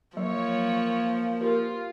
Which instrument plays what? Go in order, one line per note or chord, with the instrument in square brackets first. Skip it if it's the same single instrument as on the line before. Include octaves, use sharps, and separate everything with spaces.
[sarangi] F3 [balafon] F#3 [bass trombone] A#3 [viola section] C#5
[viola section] F4 [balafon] G4 A#4